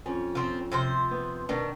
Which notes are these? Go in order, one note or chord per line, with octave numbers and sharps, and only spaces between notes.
F2 C#4
F3 C4
C3 F3 C5
B3
B2 D#3 D4